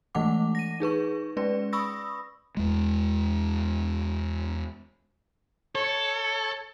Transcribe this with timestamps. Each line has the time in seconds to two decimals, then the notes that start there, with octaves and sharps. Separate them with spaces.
0.15 E3 G#3 A3 F#5 D6
0.55 A#6 D#7
0.80 D#4 G#4 B4 C#6
1.37 G#3 C#4 B4 D5
1.73 B5 C#6 D#6 E6 A#6
2.57 E2 G#3
5.75 A4 C#5